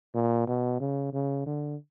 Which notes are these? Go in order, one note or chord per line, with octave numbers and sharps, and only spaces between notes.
A#2
B2
C#3
C#3
D3